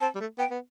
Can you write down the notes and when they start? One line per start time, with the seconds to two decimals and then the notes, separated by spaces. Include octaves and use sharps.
0.01 C4 A5
0.15 G3
0.20 A3
0.39 B3 G5
0.51 B3